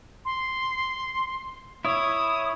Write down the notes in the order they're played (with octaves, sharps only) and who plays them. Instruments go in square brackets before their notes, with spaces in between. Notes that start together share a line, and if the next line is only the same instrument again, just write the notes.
[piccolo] C6
[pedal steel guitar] E4 C#5 [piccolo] D#6